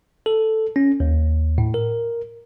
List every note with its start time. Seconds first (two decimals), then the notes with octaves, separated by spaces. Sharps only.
0.26 A4
0.76 C#4
1.00 D#2
1.58 A2
1.74 A#4